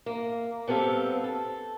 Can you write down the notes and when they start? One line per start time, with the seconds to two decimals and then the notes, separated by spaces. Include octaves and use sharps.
0.06 A#3
0.68 G3 B3 C4 A4 F5
1.24 A4